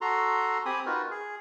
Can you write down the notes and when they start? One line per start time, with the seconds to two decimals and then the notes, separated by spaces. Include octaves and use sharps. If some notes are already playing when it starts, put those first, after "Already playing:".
0.01 F#4 A4 A#5 C6
0.66 C4 G4 G#5 B5 D#6
0.86 D#4 F4 F#4 A#4 B4
1.11 G#4